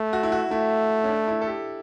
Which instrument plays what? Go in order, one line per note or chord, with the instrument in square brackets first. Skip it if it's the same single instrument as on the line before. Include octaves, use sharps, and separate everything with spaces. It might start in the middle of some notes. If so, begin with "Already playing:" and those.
Already playing: [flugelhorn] A3
[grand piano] F#4
E4
F#4
[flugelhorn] A3 [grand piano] E4
[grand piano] C#4
D4
E4
A4
G4